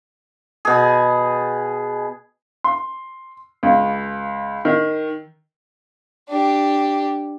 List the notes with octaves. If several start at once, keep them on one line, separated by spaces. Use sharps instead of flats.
B2 G#4
C6
C#2
D#3
D4 G4